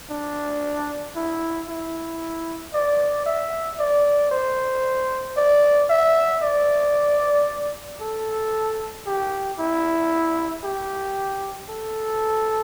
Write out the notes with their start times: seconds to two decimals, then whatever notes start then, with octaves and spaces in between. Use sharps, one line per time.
0.10 D4
1.16 E4
1.68 E4
2.74 D5
3.26 E5
3.79 D5
4.31 C5
5.37 D5
5.89 E5
6.43 D5
8.01 A4
9.06 G4
9.59 E4
10.64 G4
11.69 A4